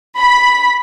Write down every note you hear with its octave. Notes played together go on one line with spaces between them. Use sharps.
B5 B6